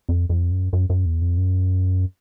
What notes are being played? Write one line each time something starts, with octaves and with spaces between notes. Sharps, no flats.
F2
F2
F#2
F#2
F#2
E2
F2
F#2